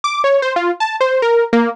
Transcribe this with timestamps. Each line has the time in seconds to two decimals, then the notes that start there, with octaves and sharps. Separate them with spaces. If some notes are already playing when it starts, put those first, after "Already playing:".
0.04 D6
0.24 C#5
0.42 C5
0.56 F4
0.80 A5
1.01 C5
1.22 A#4
1.53 A#3